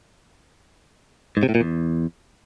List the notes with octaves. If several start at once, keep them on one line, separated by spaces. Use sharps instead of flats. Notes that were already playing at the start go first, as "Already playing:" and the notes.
G#2
C3
A2
A#2
E2